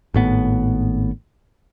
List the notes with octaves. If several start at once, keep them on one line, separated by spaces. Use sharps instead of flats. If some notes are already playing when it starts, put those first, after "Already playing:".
G#1 A2 B3